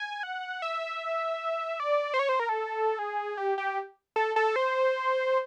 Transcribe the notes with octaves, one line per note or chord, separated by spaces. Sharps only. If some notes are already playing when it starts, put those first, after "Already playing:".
Already playing: G#5
F#5
E5
D5
C5
C#5
C5
A#4
A4
G#4
G4
G4
A4
A4
C5